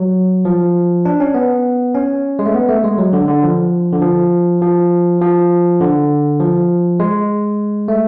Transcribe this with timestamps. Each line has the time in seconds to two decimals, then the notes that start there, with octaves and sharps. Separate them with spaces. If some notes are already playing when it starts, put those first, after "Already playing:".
Already playing: F#3
0.45 F3
1.05 D4
1.20 C#4
1.34 B3
1.95 C#4
2.39 G#3
2.46 A3
2.54 B3
2.69 A3
2.84 G#3
2.98 F#3
3.13 D3
3.28 D3
3.43 F3
3.92 D3
4.02 F3
4.62 F3
5.21 F3
5.80 D3
6.40 F3
7.00 G#3
7.88 A3